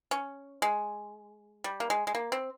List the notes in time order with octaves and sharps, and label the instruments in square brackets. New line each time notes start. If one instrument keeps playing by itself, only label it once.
[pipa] C#4
G#3
G3
A#3
G#3
G#3
A#3
C4